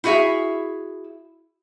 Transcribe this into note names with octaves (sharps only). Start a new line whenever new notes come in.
E4 F#4 G#4 E5 F5